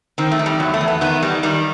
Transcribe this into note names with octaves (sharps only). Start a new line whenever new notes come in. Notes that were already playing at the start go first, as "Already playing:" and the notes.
D#3 C4
A3
D#3
G3
E2 F#3
A3
E2
B3
D#3 B3
D#3 G3
D#3 G3